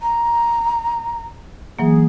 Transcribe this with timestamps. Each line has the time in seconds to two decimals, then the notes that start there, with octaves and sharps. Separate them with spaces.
0.01 A#5
1.79 E3 F#3 A#3 G#4